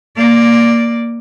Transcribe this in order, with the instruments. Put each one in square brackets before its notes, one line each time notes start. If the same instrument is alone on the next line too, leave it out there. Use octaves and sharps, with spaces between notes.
[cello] A#3 D5